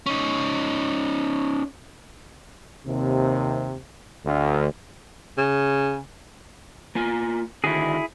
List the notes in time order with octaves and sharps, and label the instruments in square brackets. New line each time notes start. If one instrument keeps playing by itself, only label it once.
[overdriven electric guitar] C#4 D#4
[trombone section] D#2 C3
D2
[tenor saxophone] C#3
[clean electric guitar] A#3 F4 G#5
[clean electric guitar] D3 D#3 F#4 [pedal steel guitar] E4 G#4